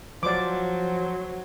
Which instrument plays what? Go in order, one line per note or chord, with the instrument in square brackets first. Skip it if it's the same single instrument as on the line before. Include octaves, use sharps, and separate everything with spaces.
[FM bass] F3 [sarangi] F#3 [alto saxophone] C5 [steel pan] D5 D6